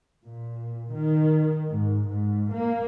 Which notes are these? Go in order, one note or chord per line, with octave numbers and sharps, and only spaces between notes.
A#2
D#3
G#2
G#2
A#3